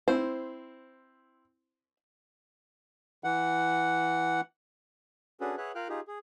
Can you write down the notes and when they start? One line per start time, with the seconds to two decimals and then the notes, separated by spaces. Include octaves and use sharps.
0.08 C4 E4 C5
3.24 E3 F#5
5.41 C#4 D4 F#4 G#4 A4 B4
5.58 G#4 B4 C#5 E5 F#5 F#6
5.75 F4 A#4 F5 G5 F6 F#6
5.89 D#4 F4 G4 G#4
6.07 G#4